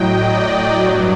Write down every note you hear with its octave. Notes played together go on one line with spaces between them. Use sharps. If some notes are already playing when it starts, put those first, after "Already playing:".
Already playing: A2 F#3 D#5 G5
D5
G2 F#3